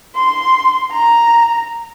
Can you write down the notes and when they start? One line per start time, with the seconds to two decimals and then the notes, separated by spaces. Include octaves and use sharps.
0.15 C6
0.91 A#5